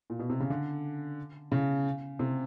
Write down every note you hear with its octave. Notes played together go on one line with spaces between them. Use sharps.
A#2
B2
C3
C#3
D3
C#3
C3